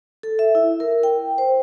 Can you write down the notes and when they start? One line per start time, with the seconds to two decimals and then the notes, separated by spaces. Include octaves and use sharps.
0.23 A4
0.39 E5
0.55 E4
0.80 A#4
1.03 G5
1.38 C5